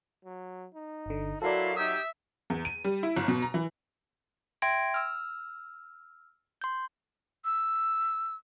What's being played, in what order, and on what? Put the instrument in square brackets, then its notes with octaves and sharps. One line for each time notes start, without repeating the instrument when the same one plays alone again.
[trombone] F#3
D#4
[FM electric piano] G1 D3
[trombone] F#3 [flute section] E4 F5 C6 [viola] F#4 [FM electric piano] A4 A#4 D5
[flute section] D#4 G4 G#6 [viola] E5 [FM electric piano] D#6
[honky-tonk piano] E2
D#7
G3
E4
G1
B2
A#5
E3
[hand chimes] E5 G5 C6 G#6 A#6 D7
E6 F6
C6 G6
[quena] E6